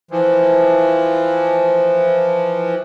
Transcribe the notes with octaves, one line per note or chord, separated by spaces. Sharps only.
E3 F3